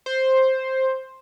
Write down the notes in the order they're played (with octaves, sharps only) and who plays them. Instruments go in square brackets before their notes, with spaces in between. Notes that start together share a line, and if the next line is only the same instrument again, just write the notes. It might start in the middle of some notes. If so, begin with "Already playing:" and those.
[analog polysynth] C5